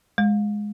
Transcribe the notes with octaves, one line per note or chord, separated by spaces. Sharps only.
G#3